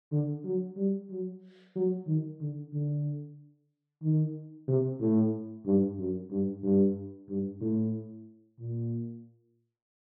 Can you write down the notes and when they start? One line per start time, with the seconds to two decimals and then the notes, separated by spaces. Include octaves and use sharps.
0.12 D3
0.44 F#3
0.77 G3
1.10 F#3
1.76 F#3
2.07 D#3
2.40 D3
2.73 D3
4.03 D#3
4.68 C3
5.01 A2
5.66 G2
5.99 F#2
6.31 G2
6.63 G2
7.29 G2
7.61 A2
8.60 A#2